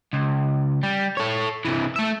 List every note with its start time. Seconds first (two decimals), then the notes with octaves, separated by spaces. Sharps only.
0.13 C#2
0.83 G3
1.17 A4 C#5
1.65 C3 E3
1.96 A3 E5